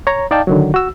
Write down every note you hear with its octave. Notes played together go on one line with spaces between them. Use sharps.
C#5 A#5
D#4 D5 F5 G5 A5
D3 D#3 F#3
F#4 E6